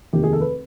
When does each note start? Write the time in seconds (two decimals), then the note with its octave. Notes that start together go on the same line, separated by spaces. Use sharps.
0.13 F1 D#2 D#3 G4
0.23 G#4
0.33 A4
0.41 B4